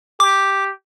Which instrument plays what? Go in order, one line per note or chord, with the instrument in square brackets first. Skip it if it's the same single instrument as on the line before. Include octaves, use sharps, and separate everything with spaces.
[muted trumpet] G4 [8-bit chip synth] D6